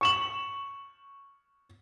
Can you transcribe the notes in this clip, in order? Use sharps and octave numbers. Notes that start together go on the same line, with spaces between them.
C#6 E7 F#7